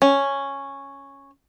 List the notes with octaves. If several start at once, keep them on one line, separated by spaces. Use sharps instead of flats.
C#4